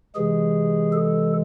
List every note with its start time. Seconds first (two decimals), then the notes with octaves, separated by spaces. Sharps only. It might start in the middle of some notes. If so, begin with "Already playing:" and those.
0.15 C3 E3 G#3 G#4
0.92 A4